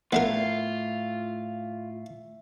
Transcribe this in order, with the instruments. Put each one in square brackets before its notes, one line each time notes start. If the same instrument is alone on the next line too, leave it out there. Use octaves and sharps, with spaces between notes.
[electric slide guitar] A2 [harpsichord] B3 D4 A#4 [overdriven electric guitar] F4 [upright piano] E5